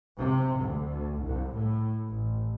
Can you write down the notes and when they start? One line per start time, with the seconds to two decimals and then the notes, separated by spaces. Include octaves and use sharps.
0.18 C3
0.60 D2
1.21 C2
1.53 A2
2.08 A1